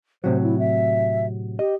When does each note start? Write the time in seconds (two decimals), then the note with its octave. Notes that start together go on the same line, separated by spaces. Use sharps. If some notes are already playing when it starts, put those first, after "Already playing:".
0.24 A2 C3 F#3 C5
0.43 E4
0.59 E5
1.59 G4 D#5